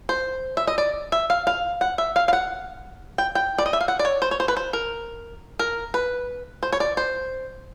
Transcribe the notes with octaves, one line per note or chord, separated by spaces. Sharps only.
C5
E5
D#5
D5
E5
F5
F5
F#5
E5
F5
F5
F#5
G5
G5
D5
D#5
E5
F5
F#5
D5
C#5
C5
C#5
C5
B4
C5
A#4
A#4
B4
C5
C#5
D5
C5